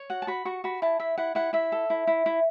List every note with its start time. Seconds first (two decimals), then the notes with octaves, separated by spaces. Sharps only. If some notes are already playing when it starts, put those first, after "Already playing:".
Already playing: C#5
0.10 F#4 F#5
0.22 A5
0.27 F#4 B5
0.45 F#4 C#6
0.64 F#4 B5
0.82 E4 A5
1.00 E4 E5
1.18 E4 F#5
1.35 E4 F#5
1.53 E4 E5
1.72 A4
1.90 E4
2.07 E4
2.26 E4